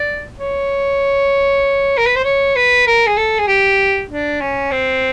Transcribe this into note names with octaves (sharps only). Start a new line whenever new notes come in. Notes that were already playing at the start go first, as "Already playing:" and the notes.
Already playing: D5
C#5
A#4
B4
C5
C#5
B4
A#4
G#4
A4
G#4
G4
D4
C#4
C4